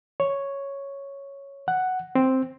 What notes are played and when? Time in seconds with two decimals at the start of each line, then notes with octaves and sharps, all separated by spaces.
0.20 C#5
1.68 F#5
2.15 C4